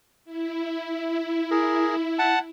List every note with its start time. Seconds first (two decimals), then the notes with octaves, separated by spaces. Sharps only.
0.25 E4
1.51 G#4 A#4
2.19 F#5 A5